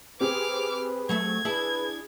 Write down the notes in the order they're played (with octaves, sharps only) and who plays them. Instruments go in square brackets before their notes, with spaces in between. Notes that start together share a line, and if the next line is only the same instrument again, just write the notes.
[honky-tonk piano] C4 G4 G#4 [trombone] B4 [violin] D6 F6
[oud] F#3 A3 E5 [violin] G#6
[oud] D4 E4 [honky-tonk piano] G#4 [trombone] B4